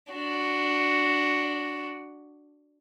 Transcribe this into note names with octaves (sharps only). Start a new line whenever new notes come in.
D4 F#4